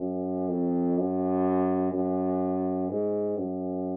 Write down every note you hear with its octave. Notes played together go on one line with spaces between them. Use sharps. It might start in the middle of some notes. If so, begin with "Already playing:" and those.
Already playing: F#2
F2
F#2
F#2
G#2
F#2